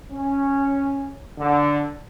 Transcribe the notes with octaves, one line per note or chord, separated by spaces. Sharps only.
C#4
D3